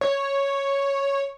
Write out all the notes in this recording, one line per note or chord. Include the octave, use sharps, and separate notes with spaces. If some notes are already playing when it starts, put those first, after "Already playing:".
C#5